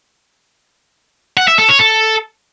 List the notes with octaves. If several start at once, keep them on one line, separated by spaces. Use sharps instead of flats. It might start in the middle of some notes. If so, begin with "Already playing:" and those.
F#5
E5
A4
C#5
A4